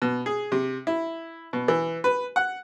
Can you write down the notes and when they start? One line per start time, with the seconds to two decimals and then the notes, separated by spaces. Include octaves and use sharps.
0.02 B2
0.26 G#4
0.52 C3
0.87 E4
1.53 B2
1.68 E3
2.04 B4
2.36 F#5